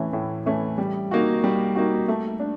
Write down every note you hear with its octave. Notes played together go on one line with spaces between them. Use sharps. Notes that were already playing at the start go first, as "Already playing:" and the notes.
Already playing: A2 E3 A3 C#4
A2
E3 A3 C#4
G3
A#3 D#4 F#4
G3
A#3 D#4 F#4
A3
D4